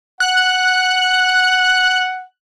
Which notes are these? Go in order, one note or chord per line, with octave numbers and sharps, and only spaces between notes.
F#5 F#6